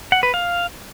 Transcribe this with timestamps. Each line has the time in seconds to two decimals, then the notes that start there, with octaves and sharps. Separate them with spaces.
0.12 F#5
0.23 B4
0.34 F5